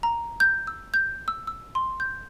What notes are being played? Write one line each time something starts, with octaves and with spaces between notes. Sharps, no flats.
A#5
G6
E6
G6
E6
E6
C6
G6